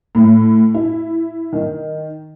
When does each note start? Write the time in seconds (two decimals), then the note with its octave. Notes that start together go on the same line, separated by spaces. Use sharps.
0.15 A2
0.74 E4
1.53 D#3